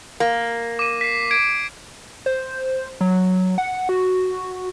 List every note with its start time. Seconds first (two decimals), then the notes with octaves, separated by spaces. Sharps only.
0.20 A#3
0.79 D6 D#7
1.01 B6 C7
1.31 G#6 D7
2.26 C5
3.01 F#3
3.58 F#5
3.89 F#4